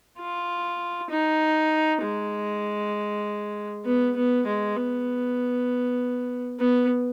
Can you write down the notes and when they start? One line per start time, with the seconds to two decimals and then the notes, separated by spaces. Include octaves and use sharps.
0.19 F4
1.10 D#4
2.02 G#3
3.85 B3
4.16 B3
4.46 G#3
4.77 B3
6.60 B3